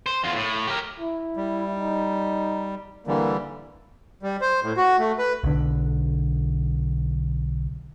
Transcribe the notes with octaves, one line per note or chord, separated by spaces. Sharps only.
C5
E2 F4
A2
G4 A#4
E4
G3
D#4
D3 E3 G3 A#3
G3
C5
A2
F#4
A3
B4
B1 D3